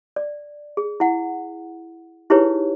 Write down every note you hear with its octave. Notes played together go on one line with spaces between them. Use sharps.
D5
G#4
E4 F#5
D#4 E4 G4 G#4 B4 C#5